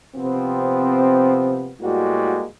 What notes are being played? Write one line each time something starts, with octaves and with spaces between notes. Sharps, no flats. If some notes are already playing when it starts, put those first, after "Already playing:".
C3 F3 B3 C4
A2 G3 G#3 A#3 F#4